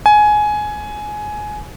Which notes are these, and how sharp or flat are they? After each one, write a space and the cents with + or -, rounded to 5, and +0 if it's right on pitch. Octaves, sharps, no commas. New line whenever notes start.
G#5 +15